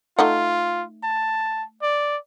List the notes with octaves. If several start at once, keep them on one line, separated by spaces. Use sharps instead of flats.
A3 D#4 F4 F#5
A5
D5